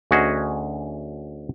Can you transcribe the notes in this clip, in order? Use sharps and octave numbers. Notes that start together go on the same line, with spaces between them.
D2 C#4 F#4 G#4 D#5